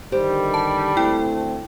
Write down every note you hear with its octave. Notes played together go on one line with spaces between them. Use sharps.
D3 D#3 G3 G4 C5
A5
D2 A3 C4 E4 G5